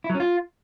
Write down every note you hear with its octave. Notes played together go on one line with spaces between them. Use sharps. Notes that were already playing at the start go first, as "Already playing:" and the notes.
E4
F#3
C#4
F4